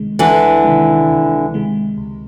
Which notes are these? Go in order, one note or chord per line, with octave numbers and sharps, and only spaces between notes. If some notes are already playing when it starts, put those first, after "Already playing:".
Already playing: C#2 C3 D#3 G#3
C#2 D3 E3
C3 D#3 G#3
C#2
C3 D#3 G#3
C#2